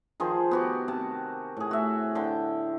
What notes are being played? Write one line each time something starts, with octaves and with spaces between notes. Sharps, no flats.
D#3 F3 G#4 C5
B3 F#4 G4
C3 A5
A2 G#4
F#4 E5
D3 G5 A5